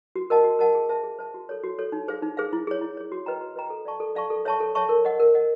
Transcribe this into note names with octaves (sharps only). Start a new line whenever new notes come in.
F#4
A#4 D#5 F#5 A5
F#4
A#4 D#5 F#5 A5
G#4
C5 E5 A5
G#4
C5 E5 A5
F#4
A4 C#5
F#4
A4 C#5
D#4
G#4 C5 F5
D#4
G#4 C5 F5
E4
G#4 C#5
E4
G#4 C#5
F#4
B4 D#5 G5 A#5
F#4
B4 D#5 G5 A#5
A4
D5 F5 A5 C#6
A4
D5 F5 A5 C#6
A4
C#5 E5 A5 C#6
A4
C#5 E5 A5 C#6
A#4
D#5 F#5
A#4
D#5 F#5